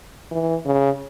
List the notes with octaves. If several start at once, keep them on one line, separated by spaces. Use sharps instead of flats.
E3
C#3